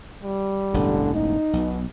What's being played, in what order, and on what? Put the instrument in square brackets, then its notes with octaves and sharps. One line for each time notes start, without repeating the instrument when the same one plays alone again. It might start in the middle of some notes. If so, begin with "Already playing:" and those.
[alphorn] G3
[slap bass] E1 A1 G2 [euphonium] D3
[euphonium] D#4
[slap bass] B1 [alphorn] B2